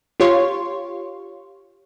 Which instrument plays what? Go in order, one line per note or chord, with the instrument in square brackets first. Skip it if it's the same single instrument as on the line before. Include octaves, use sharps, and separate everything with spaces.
[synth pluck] F4 G4 C#5 F5 C6 C#6